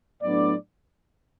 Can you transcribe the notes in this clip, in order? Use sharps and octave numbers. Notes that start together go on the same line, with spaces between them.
A2 F#3 B3 D4 D5